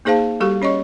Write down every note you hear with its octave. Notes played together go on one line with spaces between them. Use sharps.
A#3 D#4 G#4 C5 F5 A5
G3 F#4 G4 A4 C#6
C#4 C#5 D#5 C#6